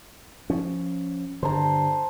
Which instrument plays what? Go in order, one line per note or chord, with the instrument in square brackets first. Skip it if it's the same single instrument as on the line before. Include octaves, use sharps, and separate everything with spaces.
[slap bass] F3 C#4
[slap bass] G2 D3 [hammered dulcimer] C5 A5 A#5